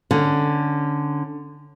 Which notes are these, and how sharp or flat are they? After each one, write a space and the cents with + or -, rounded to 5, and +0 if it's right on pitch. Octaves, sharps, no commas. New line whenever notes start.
D3 +5 C#4 +0